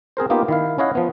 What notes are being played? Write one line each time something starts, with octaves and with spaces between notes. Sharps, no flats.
C4 G#4 A#4 C5
A#3 B3 D#4 F4 G4
D#3 E4 F5
C#4 E4 C#5 D#5 F5 F#5
F3 B3